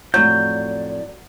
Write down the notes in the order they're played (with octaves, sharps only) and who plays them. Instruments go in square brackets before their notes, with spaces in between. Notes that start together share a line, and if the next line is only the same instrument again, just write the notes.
[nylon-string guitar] F2 A2 [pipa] F#3 [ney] D5 [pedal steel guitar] G6